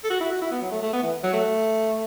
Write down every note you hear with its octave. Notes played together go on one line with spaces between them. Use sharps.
A4
F#4
E4
F#4
E4
B3
F#3
A3
A3
B3
E3
F#3
A3